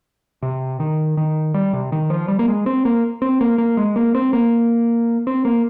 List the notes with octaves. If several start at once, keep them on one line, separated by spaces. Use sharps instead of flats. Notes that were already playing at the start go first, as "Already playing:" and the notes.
C3
D#3
D#3
G3
C3
D#3
F3
G3
A#3
G#3
C4
A#3
C4
A#3
A#3
G#3
A#3
C4
A#3
C4
A#3